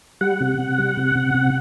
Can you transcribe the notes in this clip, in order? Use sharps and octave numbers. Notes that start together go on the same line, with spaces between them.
G3 F#5
C3
C3
G3
C3
C3
C3